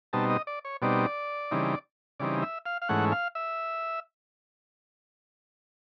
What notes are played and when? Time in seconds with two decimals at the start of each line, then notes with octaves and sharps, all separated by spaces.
0.13 B2 G3 C4 D#4 A5
0.30 D#5
0.47 D5
0.65 C#5
0.82 B2 G3 C4 D#4 D5
1.51 C#3 E3 G3 C4 D#4
2.20 C#3 E3 G3 C4 D#4 D5
2.42 E5
2.66 F5
2.82 F5
2.89 G#2 E3 A3 C#4 F#5
3.12 F5
3.35 E5